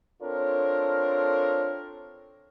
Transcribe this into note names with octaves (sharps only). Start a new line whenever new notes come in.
C4 D4 F4 A4 A#4 C#5